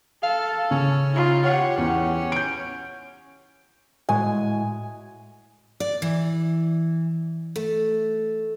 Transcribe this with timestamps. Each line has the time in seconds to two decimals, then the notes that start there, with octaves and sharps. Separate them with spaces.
0.23 A4 F5
0.71 C#3 C#4
1.11 D#4 F4
1.45 G4 C#5 F#5
1.77 E2 C#4
2.32 G6 D7
4.09 A2 G#3 F#4 G#5
5.80 D5
6.02 E3
7.56 A3